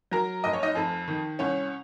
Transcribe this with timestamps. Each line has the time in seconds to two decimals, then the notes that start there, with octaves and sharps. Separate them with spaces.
0.11 F#3 A#4 A#5
0.44 F1 D#5
0.53 C#5
0.63 D#4 D#5
0.75 F2 A4
1.08 D#3
1.39 C2 C#4 C#5